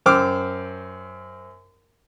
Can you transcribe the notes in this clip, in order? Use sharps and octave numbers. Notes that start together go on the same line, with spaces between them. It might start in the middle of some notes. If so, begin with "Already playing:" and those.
F#2 C5 G5 D6 E6 F6